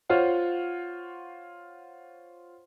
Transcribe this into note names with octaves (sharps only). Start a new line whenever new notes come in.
F4 C5 C#5 F5 F#5